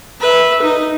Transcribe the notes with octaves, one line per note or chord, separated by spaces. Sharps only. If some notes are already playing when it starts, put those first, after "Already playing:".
B4 E5
D#4